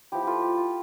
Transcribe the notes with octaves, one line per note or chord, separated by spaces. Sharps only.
F3 B3 E4 G4
F4 G4 A4
G4
F4